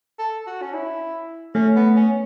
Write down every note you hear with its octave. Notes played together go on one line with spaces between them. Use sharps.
A4
F#4
C#4
E4
A3 C#4
B3
C#4